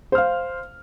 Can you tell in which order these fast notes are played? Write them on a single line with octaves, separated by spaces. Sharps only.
C5 F6 F5